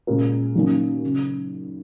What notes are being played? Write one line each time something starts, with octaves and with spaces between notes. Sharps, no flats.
A#2 G#3 C#4 F4 A#4
F#2 D#3 A#3 C#4
C#3